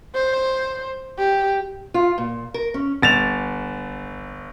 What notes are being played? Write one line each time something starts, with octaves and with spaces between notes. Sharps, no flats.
C5
G4
F4
A#2
A#4
C#4
G1 A6 E7 F7